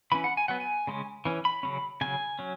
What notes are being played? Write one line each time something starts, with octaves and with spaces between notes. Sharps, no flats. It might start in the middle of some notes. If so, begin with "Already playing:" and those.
E3 C#4 B5
F#5
G#5
F#3 B3 F#5
G#5
C#3 G#3 C#4
E3 C#4
B5
C#3 F#3 C#4
C#3 F#3 C#4 G#5
F#3 C#4